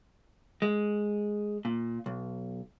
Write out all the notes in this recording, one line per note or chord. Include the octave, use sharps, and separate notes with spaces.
G#3
A#2
B1